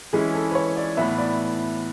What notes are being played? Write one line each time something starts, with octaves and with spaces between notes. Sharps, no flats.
E3 G#3 C#4 E4 G#4
A4
B4
C#5
D5
A2 E3 B3 E5
D5